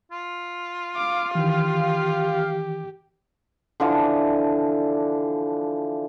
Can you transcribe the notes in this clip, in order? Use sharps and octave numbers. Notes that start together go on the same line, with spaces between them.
F4
F5 D6
D#3 E3 G4
D3 E3 F3 D4